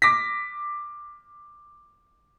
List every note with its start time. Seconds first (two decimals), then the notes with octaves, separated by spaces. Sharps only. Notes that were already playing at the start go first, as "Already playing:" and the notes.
0.02 D6 A#6 B6